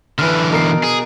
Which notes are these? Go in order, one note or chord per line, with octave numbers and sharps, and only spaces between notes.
D3 E3 B4 F6
B2 A#4 C7
G#4